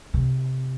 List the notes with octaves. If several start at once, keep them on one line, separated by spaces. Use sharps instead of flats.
C3